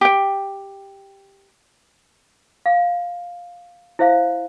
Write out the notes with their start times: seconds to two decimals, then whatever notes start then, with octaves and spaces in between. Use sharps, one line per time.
0.01 G4 G5
2.66 F5
3.99 E4 C5 E5 F5